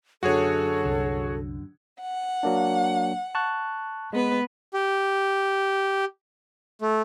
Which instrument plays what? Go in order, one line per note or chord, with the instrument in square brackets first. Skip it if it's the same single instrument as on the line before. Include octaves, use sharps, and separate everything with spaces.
[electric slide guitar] F#2 D3 [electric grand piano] F#4 G#4 C#5 [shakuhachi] A4
[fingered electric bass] C2
[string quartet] F#5
[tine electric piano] F#3 A#3 D4
A5 C#6 F#6
[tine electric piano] G#3 [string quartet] B3 B4
[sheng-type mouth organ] G4
A3